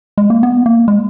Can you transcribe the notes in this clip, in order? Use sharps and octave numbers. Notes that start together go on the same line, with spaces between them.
G#3
A#3
B3
A#3
G#3